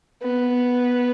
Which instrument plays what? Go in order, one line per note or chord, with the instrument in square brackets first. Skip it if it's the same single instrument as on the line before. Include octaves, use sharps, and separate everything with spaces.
[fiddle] B3